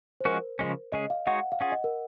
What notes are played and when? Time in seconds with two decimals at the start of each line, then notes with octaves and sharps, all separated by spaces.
0.20 C5
0.25 F3 G#3 C#4 F#4 A#4
0.59 C#3 F3 G#3 C#4
0.92 C#3 G#3 C#4 G#4 D#5
1.10 F5
1.27 G#3 D#4 F#4 C#5 F#5
1.52 F5
1.61 C#4 F4 G#4 F#5
1.72 D#5
1.84 A#4